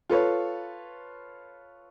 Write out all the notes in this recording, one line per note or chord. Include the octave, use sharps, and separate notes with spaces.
F4 A4 B4 C#5